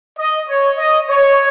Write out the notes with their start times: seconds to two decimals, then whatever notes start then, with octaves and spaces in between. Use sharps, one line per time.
0.18 D#5
0.48 C#5
0.78 D#5
1.09 C#5